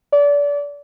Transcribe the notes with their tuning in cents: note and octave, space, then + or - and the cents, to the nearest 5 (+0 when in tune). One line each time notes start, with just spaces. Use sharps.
D5 -30